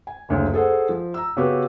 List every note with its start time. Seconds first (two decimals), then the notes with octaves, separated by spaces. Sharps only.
0.07 G#5
0.29 F#1 D2 C#3 A#3
0.53 G#4 A4 C5 F#5
0.89 F3
1.14 A#5 E6
1.37 C#3 B3 F#4 G4 B4